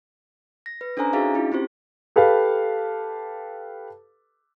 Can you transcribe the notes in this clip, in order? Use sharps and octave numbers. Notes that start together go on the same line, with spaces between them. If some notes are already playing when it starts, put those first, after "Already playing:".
A#6
B4
C#4 D4 A4 C5 G#5 A#5
D4 D#4 F#4 G#4 E5 F5
C#4 E4 F4
C4 F4 G4 C5
G4 A4 B4 F5